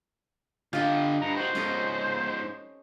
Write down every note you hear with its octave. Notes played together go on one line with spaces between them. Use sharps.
D3 D#4 F4 G4 G5
G2 A#5
D#3 F#4 C5
G#2 F3 C#4 A4 D#5